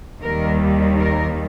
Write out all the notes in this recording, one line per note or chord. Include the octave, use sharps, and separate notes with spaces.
D#2 D#3 G3 A#4
A#4